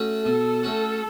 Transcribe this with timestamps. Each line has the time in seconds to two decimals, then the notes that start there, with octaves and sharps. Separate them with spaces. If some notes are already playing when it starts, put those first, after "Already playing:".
Already playing: A3 C#4 F#4
0.26 B2 A4
0.63 A3 C#4 F#4